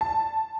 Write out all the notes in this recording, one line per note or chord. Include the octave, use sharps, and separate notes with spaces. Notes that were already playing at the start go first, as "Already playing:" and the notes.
A5